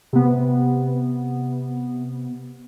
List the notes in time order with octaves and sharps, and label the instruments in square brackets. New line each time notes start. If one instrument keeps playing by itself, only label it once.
[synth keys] C3 B3